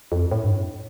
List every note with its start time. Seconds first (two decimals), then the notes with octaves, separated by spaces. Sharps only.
0.12 F2
0.31 A2
0.44 G2
0.57 F2